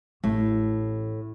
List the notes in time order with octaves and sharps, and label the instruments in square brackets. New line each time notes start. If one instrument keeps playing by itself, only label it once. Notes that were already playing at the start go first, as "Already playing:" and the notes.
[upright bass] A1 [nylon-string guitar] A2